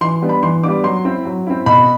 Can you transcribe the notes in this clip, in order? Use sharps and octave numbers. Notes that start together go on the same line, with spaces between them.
E3 C6
G3 B3 D4
B5
E3 C6
G3 B3 D4 D6
F#3 C6
C4 E4
F#3
C4 E4
B2 B5